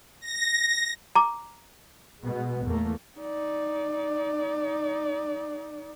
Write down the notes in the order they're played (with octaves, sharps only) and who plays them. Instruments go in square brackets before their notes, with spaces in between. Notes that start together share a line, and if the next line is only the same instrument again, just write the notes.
[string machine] A#6
[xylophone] A#5 D6
[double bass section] B2 G#3 B3
E2 A3 A#3
[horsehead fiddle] D#4 D5